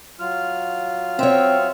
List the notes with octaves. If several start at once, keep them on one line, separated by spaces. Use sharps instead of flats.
F#3 F4 F6
C4 C#5 E5